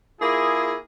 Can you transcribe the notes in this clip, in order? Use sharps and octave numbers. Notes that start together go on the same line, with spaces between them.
A#3 E4 F4 G#4